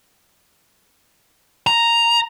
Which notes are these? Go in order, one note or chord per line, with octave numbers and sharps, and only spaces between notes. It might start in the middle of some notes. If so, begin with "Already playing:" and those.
A#5